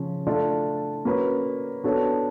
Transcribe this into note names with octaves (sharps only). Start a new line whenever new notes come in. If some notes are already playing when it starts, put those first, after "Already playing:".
Already playing: C#3 F3 C#4
A3 D4 F4 A4 D5
A#3 C#4 F#4 B4
B3 D4 F#4 A4 C#5